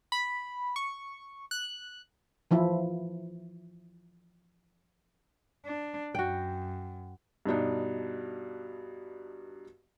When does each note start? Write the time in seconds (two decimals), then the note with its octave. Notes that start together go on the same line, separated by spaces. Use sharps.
0.12 B5
0.76 C#6
1.51 F#6
2.51 E3 F3 E4
5.66 D4
6.15 F#2 F#4 G5
7.46 G2 B2 D4 D#4